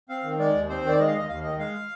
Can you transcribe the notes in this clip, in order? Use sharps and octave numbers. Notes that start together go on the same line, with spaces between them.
C4 F5
D#3
G#3 D5
D#2
C4 C5
D#3 D5
G#3 D#5
F5
D#2 D#5
D#2 F5
D#3 D#5
G#3 F5